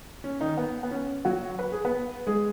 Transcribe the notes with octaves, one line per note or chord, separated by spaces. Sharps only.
C#4
D#3 D#4
B3
B3
C#4
F#3 F#4
B4
G#4
B3 B4
G#3 G#4